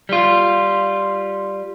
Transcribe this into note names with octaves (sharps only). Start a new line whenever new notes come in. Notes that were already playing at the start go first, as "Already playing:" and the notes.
G3 F4